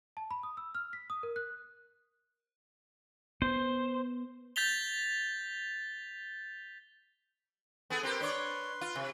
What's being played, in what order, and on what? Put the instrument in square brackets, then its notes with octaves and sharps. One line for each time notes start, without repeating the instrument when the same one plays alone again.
[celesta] A5
B5
D#6
E6
F6
B6
D#6
A#4
F#6
[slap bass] B3 [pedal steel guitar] C5
[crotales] G6 A6 B6 F7 G7
[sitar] B3 G#4 A4
[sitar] C4 G4 A#4 [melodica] B4 C6
[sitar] D4 C#5 D5
F4
C3